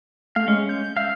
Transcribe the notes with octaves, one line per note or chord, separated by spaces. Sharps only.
A3 F5
G#3 C#4
G6
E5 F5